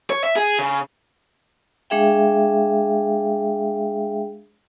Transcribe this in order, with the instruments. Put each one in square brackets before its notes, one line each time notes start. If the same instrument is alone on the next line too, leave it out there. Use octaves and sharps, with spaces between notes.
[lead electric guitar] C#5
E5
G#4
C#3
[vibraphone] G#3 D4 G#4 E5 F5 G5